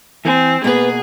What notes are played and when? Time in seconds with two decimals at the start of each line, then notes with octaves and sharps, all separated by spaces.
0.25 E3 C4 G#5
0.64 B2 A#3 B3 G#4 B4 F#5